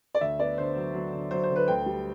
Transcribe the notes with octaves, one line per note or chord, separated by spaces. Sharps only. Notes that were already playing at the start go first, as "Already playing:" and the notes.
D5
D2 E5
B3 D5
D3 C5
F#3
F#3
D3
F#3 C5
C5
D3
B4
D2 G5
G3